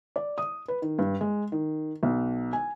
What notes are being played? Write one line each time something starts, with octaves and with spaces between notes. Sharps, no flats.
D5
D#6
B4
D#3
G2
G#3
D#3
B1
G#5